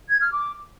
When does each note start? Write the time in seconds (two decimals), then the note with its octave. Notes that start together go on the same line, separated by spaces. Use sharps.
0.08 G#6
0.20 F6
0.31 D6